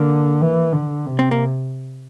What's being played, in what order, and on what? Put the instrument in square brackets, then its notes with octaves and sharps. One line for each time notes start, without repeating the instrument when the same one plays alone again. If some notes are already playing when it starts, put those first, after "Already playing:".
Already playing: [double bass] D3 [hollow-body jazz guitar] A#3
[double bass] E3
D3
C3
[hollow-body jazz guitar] C4
A#3